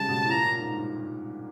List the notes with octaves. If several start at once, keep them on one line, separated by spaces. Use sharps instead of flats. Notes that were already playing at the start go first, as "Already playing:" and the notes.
Already playing: C#3 F3 G3 G#3 A5
B2
A2
A#2 A#5
A#2
G#2
G2
G2